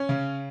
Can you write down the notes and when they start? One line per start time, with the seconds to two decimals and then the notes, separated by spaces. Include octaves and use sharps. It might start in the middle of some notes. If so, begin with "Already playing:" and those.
Already playing: C#4 C#5
0.09 C#3